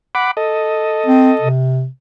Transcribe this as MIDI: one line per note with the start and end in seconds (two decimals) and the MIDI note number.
0.15 0.31 78
0.15 0.31 83
0.15 0.31 86
0.37 1.49 69
0.37 1.49 75
1.06 1.32 60
1.41 1.86 48